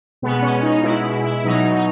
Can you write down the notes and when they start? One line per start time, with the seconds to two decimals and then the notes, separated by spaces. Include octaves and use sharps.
0.22 B2 G#3 B3
0.42 C#4
0.62 D#4
0.83 B2 G#3 E4
1.04 E4
1.24 E4
1.44 B2 F#3 D#4
1.75 D#4